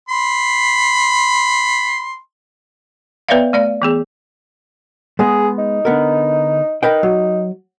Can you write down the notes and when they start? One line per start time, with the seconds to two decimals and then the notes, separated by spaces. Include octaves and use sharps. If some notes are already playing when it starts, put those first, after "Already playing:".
0.09 B5 C6
3.29 B3 B4 C#5 D5 E5 F5
3.53 A3 D5 F5
3.82 E3 B3 G#4
5.19 G#3 B3 G#4
5.58 D#4
5.85 D3 B3 A#4
6.83 D#4 A#4 B4 G5
7.03 F#3